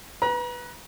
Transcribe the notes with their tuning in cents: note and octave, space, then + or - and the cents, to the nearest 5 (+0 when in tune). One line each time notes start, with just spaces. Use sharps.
B4 +0 A#5 +40